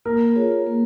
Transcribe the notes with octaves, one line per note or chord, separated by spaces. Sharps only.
A#3 A#4
F4 G#4 C#5
A#3